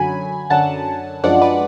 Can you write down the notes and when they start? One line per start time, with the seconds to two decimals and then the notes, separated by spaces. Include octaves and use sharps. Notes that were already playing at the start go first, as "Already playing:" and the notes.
Already playing: F#2 D3 F#3 G#5 B5
0.50 F#2 D3 F#3 F#5 A5
1.24 F#2 F3 G#3 D4 D5 F#5
1.41 B4 D5